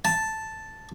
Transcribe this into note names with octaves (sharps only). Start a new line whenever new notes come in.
A5